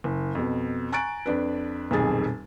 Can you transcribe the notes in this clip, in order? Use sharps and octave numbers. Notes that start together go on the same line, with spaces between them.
F#1
F2 B2
G#5 A#5 C#6 F#6 A6 D7
F2 D4 B4
D#1 B1 F2 G#4 A6